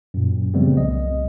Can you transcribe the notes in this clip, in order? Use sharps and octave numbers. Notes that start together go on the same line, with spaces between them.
F#2 A#2
C#3 F3 G3 A3 B3 C4
C2 D#5